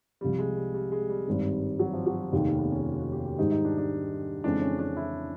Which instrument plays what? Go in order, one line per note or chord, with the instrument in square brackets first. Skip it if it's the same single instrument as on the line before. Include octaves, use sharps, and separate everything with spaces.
[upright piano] C2 C3 F3 [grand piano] G3
[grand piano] G#3
G3
G3
G#3
G3
[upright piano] G#1 G2 D#3
[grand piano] F#3
F3
F#3
G3
[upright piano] F1 D#2 D#3 [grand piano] G#3
[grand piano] A#3
B3
C#4
F4
F#4
G4
G4
[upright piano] G#2 D#3 G3 [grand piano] D#4
[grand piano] D#4
D4
D4
[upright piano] F2 C#3 E3 G#3 [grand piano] D4
[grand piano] C#4
D4
E4